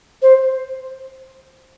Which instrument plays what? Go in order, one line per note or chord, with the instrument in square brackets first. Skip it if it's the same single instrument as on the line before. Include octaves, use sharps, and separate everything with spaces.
[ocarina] C5